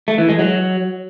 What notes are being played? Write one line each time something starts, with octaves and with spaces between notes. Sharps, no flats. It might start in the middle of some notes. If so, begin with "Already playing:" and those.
A3
E3
G#3
F#3